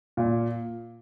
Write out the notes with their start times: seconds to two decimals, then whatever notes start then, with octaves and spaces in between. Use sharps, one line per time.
0.17 A#2